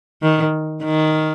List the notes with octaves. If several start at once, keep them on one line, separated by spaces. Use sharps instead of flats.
D#3
D#3